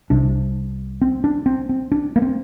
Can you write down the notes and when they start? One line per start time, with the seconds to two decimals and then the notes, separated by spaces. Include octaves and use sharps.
0.10 C2 C3 D4
1.02 C4
1.24 D4
1.46 C4
1.69 C4
1.92 D4
2.16 A#3
2.22 C4